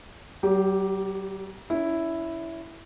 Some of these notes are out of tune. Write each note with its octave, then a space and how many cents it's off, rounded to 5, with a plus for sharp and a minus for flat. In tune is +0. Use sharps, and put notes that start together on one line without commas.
F#3 +45 G4 +0
C#4 +40 E4 +0